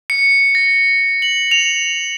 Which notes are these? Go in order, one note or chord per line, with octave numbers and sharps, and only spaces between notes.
C#7
A#6
F#7
F7